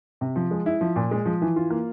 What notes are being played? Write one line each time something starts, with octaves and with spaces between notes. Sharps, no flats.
C3
F3
G#3
E4
F3
A#2
G#3
F3
E3
F4
A#3